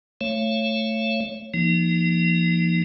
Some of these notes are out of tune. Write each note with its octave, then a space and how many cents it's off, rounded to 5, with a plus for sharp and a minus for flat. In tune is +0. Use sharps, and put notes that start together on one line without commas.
A3 +0 C#5 -10 F5 -45
F3 -35 A#3 +0 D#4 +5